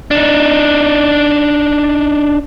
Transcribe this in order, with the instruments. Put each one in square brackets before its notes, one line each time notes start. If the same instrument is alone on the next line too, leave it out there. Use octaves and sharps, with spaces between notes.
[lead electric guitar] D4 D#4